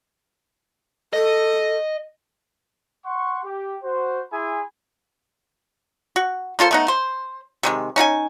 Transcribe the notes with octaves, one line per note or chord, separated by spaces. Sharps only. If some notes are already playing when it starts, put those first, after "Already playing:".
A4 D#5
F#5 C6 C#6
G4
F#4 C5
E4 G#4 G#5 B5 C6
F#4
A#3 F4 A4 C5
A3 B3 D#4
C5
C3 D#3 G#3
C#4 D#4 G#4 G#5